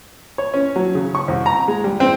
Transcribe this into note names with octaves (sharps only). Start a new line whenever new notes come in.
C#5
C#4
F#3
C#3
C#6
C2
A#5
G#3
G3
C4